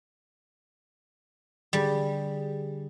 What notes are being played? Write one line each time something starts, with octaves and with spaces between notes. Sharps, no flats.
D3 G3 G4 G#4